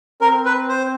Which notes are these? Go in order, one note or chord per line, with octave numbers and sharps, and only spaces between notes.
C4 A#4
B4
C5